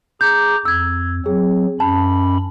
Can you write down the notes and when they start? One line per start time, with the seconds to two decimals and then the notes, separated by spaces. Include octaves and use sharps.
0.21 G#4 A#5 D6 G6
0.65 F2 E6 G#6
1.26 F#3 C4 G#4
1.80 F#2 C#4 A5 B5